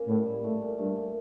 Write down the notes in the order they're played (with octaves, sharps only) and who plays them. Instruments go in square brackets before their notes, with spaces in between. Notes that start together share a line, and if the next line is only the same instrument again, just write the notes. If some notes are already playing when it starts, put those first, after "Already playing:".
Already playing: [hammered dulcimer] C#3 A#3
[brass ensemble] A2 [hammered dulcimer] G3
[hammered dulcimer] G3
[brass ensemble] A2 [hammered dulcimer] A3
[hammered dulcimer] A#2
[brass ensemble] G2 [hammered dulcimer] A3
[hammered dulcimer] A#2